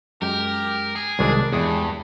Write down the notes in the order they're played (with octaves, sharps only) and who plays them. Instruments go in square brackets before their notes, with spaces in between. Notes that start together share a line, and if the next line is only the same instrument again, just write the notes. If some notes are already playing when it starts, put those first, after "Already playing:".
[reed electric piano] F#2 G#3 G6 [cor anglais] G4 [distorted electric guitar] A#4
[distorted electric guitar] G#4
[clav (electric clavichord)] C2 D#3 G#3 [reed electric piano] F#3 A#4 [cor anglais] D4
[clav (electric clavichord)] E2 [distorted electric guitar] G2 [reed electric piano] G#3 [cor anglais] G#4